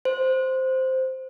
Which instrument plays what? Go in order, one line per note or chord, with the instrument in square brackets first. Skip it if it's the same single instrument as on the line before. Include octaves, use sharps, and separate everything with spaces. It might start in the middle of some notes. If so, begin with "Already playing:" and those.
[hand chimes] C5